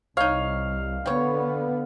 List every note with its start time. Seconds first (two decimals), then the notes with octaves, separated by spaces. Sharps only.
0.17 C2 D#4 C#5 F5
1.06 D3 G3 B3 C#5